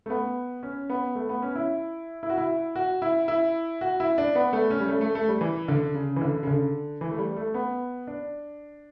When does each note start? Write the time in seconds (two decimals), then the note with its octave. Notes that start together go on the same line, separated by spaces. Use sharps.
0.06 A3
0.10 B3
0.63 C#4
0.90 B3
1.15 A3
1.29 B3
1.42 C#4
1.56 E4
2.23 E4
2.30 F#4
2.38 E4
2.76 F#4
3.02 E4
3.28 E4
3.81 F#4
4.00 E4
4.18 D4
4.35 B3
4.53 A3
4.70 C#4
4.80 G3
4.88 A3
5.01 A3
5.15 A3
5.29 G3
5.41 E3
5.68 D3
5.94 C#3
6.16 E3
6.22 D3
6.43 C#3
6.47 D3
7.01 E3
7.11 A3
7.18 G3
7.37 A3
7.54 B3
8.07 D4